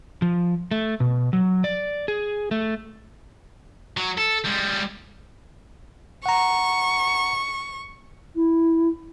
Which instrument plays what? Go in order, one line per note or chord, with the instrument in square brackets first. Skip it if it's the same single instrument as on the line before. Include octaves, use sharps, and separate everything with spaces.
[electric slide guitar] F3
A3
B2
F#3
D5
G#4
A3
[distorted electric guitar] F#3
A4
G3 G#3
[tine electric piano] F#5 A#5 [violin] C#6
[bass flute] E4